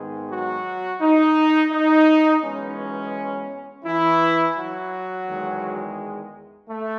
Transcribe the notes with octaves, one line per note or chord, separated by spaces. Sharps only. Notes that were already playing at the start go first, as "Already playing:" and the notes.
Already playing: G#2 D#3 G#3 B3
F#3 F#4
D#4
D#4
F#2 E3 G#3 B3 C#4
E3 E4
F#3 F#4
E2 D#3 G#3
A3